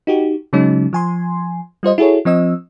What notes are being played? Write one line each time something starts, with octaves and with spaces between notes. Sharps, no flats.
D#4 F#4 G4
C#3 F#3 G#3 C#4 D#4
F3 G#5 C6
G3 F4 C5 D#5
E4 F#4 G#4 A4 C#5
F3 C4 D#5 E6